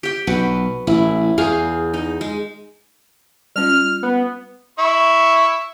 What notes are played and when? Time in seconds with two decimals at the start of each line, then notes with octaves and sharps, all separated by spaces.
0.03 G4 G5
0.27 B1 F#4 B4
0.87 A1 E4
1.38 E2 G#4 F5
1.94 D#4
2.21 G#3
3.56 G3 C#4 F4 F6
4.03 B3
4.79 E4 C#6